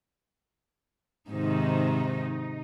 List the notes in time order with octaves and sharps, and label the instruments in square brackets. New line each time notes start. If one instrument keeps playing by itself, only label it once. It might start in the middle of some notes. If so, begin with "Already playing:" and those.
[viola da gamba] G#2 C3 D#3 [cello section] D#4